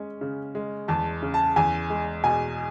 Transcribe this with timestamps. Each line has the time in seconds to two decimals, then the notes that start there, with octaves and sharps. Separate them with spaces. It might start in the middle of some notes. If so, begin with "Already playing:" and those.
Already playing: G#3 C#4
0.21 C#3
0.55 G#3
0.88 E2 A5
1.22 C#3
1.34 A5
1.56 E2 G#5
1.90 G#3
2.24 B2 G#5